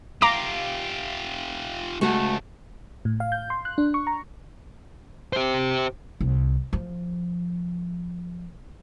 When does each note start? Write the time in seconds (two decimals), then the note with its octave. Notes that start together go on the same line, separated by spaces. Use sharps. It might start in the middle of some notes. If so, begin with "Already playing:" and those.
0.22 F4 G4 F5 A#5 D6
2.01 C#2 A3 F#4
3.05 A2
3.20 F5
3.32 G6
3.50 C6
3.65 F#6
3.78 D4
3.94 C#6
4.07 A#5
5.33 G4 C5
6.21 C2
6.73 F3